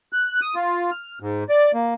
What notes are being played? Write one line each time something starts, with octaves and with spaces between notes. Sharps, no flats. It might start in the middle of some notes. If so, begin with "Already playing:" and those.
F#6
D#6
F4
F6
G#2
D5
A#3